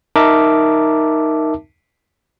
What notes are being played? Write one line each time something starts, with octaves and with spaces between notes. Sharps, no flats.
D#4 A#4 E5 A5 D6